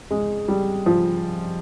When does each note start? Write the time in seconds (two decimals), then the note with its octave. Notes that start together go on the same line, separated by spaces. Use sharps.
0.11 G#3
0.48 G3
0.86 F3